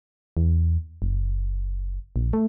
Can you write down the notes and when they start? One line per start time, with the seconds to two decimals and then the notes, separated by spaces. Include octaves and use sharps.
0.37 E2
1.02 F#1
2.16 A#1
2.33 A3